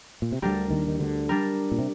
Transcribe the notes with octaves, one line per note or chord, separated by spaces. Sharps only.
A#2
C3
D2 D3 G3 D4 G4 A#4
D#2 D#3
D#3
D2 D3
G3 D4 G4 A#4
A#2
C3